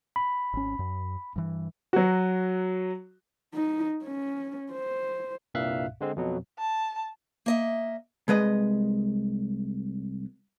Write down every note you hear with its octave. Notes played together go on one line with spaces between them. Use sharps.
B5
G#1 C#4
F#2
G2 E3
F#3 F#4
D#4
C#4
C5
C2 G2 A#2 E5 F5 F#6
D3 G#3 C4
F2 B2 F#3
A5
A#3 D#5 E5
C2 G#3 B4 D#5